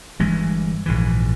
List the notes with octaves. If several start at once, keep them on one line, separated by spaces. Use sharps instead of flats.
G1 G2 E3 G#3
A#1 G#2 E3